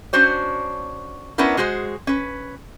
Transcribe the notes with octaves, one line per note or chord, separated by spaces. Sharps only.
C#4 D4 F#4 C5 C#5
B3 C#4 D4 E4 A#4
G#3 F#4 G#4 C5
C#4 B4